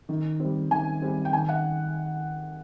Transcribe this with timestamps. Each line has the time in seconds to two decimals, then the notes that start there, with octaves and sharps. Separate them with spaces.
0.09 D#3
0.40 G3 C4
0.71 D#3 G#5
1.02 G3 C4
1.25 G5
1.32 D#3 G#5
1.49 F#5